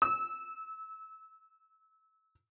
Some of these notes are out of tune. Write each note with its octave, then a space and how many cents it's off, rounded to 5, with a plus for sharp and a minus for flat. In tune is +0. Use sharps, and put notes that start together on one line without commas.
E6 -25